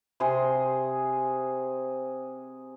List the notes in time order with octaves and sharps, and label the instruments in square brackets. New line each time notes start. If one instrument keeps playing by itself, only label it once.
[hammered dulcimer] C3 G#4 C5